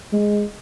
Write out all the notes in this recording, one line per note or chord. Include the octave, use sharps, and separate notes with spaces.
G#3